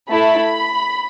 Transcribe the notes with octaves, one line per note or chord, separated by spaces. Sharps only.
A3 E4 A4 B5